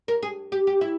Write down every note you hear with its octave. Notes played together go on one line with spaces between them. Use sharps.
A#4
G#4
G4
G4
E4